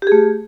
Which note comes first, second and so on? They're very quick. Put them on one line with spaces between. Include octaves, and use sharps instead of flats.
G4 G#4 A3